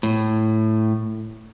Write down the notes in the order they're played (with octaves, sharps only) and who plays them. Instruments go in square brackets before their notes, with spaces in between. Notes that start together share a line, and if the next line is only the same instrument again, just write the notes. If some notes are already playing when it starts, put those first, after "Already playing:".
[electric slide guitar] A2